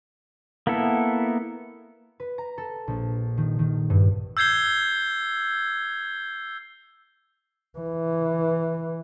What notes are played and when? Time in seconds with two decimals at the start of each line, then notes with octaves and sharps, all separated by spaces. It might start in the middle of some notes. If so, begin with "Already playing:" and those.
0.67 A#3 B3 E4 A4
2.20 B4
2.38 A#5
2.58 A4
2.88 A#1
3.37 D#3
3.59 D#3
3.90 G2
4.37 E6 G6 G#6 C7 G7
7.79 E3